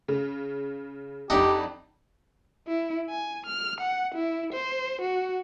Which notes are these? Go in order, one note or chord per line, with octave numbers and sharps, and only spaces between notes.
C#3
F2 D4 D#4 G4 F#5 A5
E4
G#5
F6
F#5
E4
C5
F#4